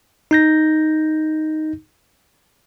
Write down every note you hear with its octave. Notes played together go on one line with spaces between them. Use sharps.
D#4 G6 A#6